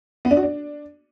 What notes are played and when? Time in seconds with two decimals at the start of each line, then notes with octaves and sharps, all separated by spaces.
0.25 B3
0.31 D4
0.37 F#4
0.43 D4